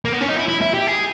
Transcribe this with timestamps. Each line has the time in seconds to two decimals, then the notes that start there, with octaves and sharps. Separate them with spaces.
0.05 A#3
0.13 B3
0.21 C#4
0.28 D#4
0.36 E4
0.48 E4
0.61 E4
0.74 G4
0.87 G#4